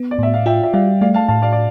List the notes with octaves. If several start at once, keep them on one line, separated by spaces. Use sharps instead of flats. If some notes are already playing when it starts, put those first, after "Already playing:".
Already playing: B3
D5
A2 E5
F5
F4 E5 G5
E5
G3 D5 F5
A3 D5 F5
F5 A5
A2 F5 A5
D5 F5
D5